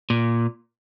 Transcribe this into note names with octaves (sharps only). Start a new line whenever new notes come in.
A#2